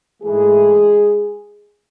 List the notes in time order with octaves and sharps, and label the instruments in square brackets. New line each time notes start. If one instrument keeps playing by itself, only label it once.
[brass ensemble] G#2 E3 G#3 A3 G#4